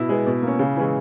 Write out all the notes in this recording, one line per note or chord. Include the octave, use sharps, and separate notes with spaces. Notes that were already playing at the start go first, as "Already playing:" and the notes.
Already playing: B2 E4
G#3 B3
B2
A#3 C#4
C#3
E3 G#3 C#4